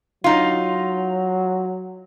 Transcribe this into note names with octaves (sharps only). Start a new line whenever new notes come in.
F#3 D#4 F4